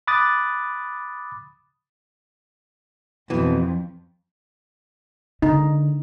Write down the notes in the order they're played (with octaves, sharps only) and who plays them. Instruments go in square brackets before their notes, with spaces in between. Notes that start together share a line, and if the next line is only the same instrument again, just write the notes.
[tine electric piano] B5 D6 D#6 F#6 A6
[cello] F2 [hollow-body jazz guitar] B2 E3
[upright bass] D3 [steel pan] D#4